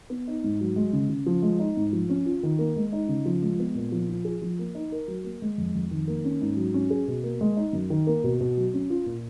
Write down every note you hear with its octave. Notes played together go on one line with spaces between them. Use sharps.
B3
D#4
G#2
F#3
G#3
C#3
C#3
F3
G#3
D#4
G#2
F3
C#4
F4
D#3
A#3
G#3
D#4
C#3
F3
G#3
B3
A#2
F3
F4
G#4
F3
A#3
D#4
A#4
F#3
A#3
G#3
F2
F2
D#3
A#3
C#4
G#2
F#3
C#4
G#4
B2
A#3
G#3
D#4
F#2
D#3
A#3
B2
B2
F#3
C#4
F4
A#2